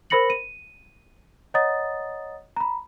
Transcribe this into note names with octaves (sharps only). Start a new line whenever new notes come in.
A#4 C5 B5 A#6 C#7 F#7
D#7
C#5 D#5 F#5 A#5 D#6 A6
A#5 B5